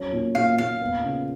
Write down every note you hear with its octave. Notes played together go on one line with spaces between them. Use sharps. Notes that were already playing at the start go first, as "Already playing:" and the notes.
Already playing: F#3 C#4
A#2
A#2 F5
A#2 F5
B3
C#3